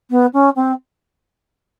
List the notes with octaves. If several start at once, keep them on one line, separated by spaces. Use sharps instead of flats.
B3
C#4
C4